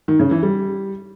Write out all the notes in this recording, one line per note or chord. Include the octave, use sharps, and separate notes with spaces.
D#3
C#3
E3
G3